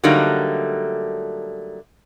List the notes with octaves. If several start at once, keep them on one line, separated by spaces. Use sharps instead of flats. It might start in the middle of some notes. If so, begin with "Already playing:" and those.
D3 F#3 G3 A3 A#3 D#4